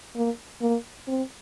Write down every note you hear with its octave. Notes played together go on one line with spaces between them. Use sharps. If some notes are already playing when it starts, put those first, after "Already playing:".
A#3
A#3
C4